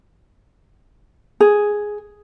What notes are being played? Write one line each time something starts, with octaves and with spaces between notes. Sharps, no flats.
G#4